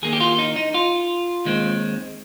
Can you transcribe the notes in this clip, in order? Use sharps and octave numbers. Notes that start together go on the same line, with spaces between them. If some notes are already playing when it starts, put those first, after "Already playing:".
D#2 D#3 A#3 G#4
G4
F4
D#4
D#4
F4
D#2 D#3 G#3 C4